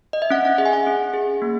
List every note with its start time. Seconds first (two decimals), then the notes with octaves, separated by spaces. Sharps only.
0.13 D#5
0.22 E5
0.30 C#4 F#5
0.45 F#5
0.58 G#4 E5
0.66 G#5
0.73 F#5
0.87 C#4
1.14 G#4
1.42 A#3